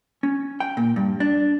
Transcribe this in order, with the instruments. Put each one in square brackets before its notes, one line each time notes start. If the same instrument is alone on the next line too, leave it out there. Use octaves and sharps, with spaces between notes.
[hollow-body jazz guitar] C#4
G5
A#2
G2
D4